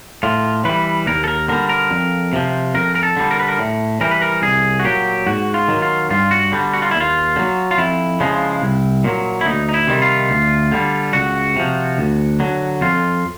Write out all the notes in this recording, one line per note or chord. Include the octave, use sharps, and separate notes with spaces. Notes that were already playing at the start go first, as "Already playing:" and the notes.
A2 F4
E3 G3 B4
D#2 A#4
A4
A#4
D3 G3 A#4
A#4
F2
C3 F3
F2 A#4
A#4
A4
D3 G3
A#4
B4
A#4
A2
E3 G3 A#4
B4
A#4
C2 G#4
F#4
A#2 F#3 G4
G#2 F#4
F4
D#3 F#3
F4
G2 F4
F#4
D3 G3
F#4
F4
D#2 E4
F4
D3
F#3
F4
F2 E4
C#3 F3 G#3
C2
A#2 F#3
E4
D2 D#4
D#4
E4
C3 D#3 G3
F4
D2
D3 G3
C#2 F#4
C3 F3
D2
D3 F#3
F2 F4